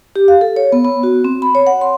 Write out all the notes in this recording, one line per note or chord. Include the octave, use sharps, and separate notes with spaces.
G4
F5
A4
C#5
B3
B3
F#4
C4
B5
C#5
F#5
C6